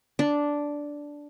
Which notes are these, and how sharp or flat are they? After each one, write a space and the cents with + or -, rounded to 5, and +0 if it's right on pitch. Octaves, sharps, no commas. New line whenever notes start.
D4 -5